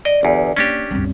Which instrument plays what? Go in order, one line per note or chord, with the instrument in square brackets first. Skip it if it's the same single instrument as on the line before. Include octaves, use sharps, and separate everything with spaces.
[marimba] D5 [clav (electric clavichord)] D#5
[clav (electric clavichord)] G1 E2
[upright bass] A#3 [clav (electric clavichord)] C#4 D4 G4
[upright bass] C2 F#2